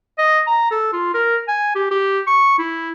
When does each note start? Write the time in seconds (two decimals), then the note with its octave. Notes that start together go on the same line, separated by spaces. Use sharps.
0.18 D#5
0.47 A#5
0.71 A4
0.93 F4
1.14 A#4
1.48 G#5
1.75 G4
1.91 G4
2.27 C#6
2.58 E4